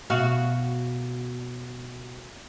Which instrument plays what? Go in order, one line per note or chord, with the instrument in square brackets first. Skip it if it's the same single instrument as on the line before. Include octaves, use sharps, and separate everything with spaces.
[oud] B2 F#4 F5